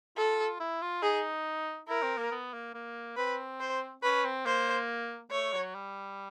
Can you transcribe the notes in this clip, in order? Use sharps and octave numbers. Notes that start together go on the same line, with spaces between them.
F4 A4
E4
F4
D#4 G#4
E4 A#4
C4
A#3
B3
A#3
A#3
C4 B4
C5
C#4 B4
C4
A#3 C5
A3 C#5
F#3
G3